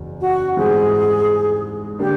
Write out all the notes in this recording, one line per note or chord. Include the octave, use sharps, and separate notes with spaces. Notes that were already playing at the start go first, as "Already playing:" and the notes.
Already playing: F#1 E2 C#3 F#3
F#4
G#2 E3 G3 C4 G#4
D3 G3 A#3 D4 G4